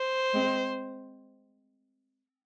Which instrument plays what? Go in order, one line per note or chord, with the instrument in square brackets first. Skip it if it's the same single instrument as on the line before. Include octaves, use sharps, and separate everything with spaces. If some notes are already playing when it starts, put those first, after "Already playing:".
Already playing: [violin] C5
[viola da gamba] G#3 C4